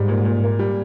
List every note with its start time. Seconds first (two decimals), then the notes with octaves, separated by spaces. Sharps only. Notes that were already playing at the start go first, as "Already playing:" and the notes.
Already playing: G#2 G3
0.08 A#2
0.25 A#2
0.43 A#3
0.59 G3